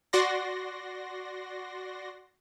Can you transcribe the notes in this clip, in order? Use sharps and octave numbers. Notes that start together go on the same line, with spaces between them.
F#4 D5 C6 A#6